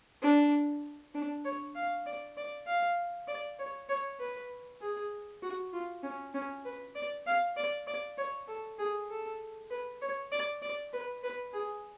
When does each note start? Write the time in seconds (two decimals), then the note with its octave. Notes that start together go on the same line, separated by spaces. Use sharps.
0.22 D4
1.14 D4
1.45 C#5
1.75 F5
2.06 D5
2.37 D5
2.66 F5
3.28 D5
3.59 C#5
3.89 C#5
4.20 B4
4.81 G#4
5.42 F#4
5.73 F4
6.03 C#4
6.34 C#4
6.65 B4
6.95 D5
7.26 F5
7.57 D5
7.87 D5
8.18 C#5
8.47 A4
8.78 G#4
9.10 A4
9.70 B4
10.01 C#5
10.32 D5
10.62 D5
10.93 B4
11.23 B4
11.53 G#4